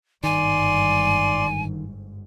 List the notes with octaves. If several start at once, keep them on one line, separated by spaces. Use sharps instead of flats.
G1 G#2 D#3 D5 G#5 C6